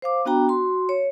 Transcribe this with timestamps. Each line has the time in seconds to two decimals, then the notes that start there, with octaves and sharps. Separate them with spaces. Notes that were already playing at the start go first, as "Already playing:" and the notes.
0.02 C5 F5 D6
0.25 B3 D4 F#4 G5 A#5
0.48 F#4 C6
0.89 C#5